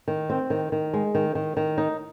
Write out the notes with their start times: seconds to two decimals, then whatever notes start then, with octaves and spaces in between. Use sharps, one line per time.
0.08 D#3
0.30 C4
0.50 D#3
0.72 D#3
0.93 G#3
1.15 D#3
1.35 D#3
1.57 D#3
1.78 D#4